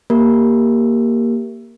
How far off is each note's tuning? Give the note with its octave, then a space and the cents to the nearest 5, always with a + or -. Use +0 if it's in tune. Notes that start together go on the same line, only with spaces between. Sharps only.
A#3 +0 G4 +0 A#4 +0